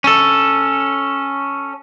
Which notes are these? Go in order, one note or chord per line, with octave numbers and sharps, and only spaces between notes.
C#4 A4